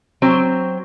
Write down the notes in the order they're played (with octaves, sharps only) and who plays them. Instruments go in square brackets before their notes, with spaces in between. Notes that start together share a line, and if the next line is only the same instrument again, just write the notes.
[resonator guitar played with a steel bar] F#3 C4